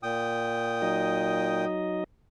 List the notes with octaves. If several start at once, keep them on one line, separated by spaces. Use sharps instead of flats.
A#2 G5 D#6
F#3 D#4 D#5